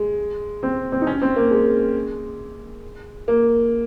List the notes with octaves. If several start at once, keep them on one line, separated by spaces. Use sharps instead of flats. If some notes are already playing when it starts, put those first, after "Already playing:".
Already playing: G#3
C4
C4
D#4
C#4
C4
A#3
G#3
A#3